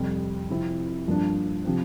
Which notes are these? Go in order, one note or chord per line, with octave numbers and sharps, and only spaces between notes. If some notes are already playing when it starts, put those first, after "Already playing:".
Already playing: F2 C3 G3
C3 F3 C4 E4
G2 F3 A#3 D4
C3 F3 C4